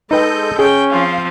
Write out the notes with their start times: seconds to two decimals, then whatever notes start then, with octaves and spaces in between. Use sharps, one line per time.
0.11 G#3 D#4 A4 B4 D#5 G5 G6
0.59 C#4 G#4 G5
0.92 F3 C4 F5